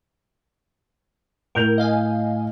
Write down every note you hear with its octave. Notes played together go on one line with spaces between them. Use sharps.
A2 A#4 G6 F7
D#5 F5 G#5